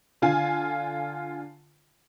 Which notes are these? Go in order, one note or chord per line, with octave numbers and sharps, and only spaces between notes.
D3 F4 G#5